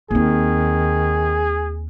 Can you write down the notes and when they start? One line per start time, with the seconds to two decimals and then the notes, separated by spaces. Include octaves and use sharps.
0.11 D#2 D#3 C4 G#4